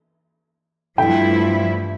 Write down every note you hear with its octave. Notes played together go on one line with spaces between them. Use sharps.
G2 F3 A3 E4 G5